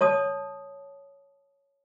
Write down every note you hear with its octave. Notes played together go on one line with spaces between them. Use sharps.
C#5 A5 D#6